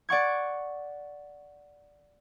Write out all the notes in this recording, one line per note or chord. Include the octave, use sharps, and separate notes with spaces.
D5 F#5 C#6 G#6